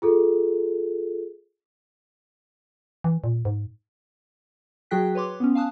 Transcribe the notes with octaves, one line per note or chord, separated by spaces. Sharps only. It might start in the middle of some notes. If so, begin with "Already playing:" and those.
F4 G#4 A4
E3
A#2
G#2
F#3 F#4 G#4 G5 F#6 B6
B4 C#5 C6 D6
B3 C#4
F5 G#5 A5 D#6 F#6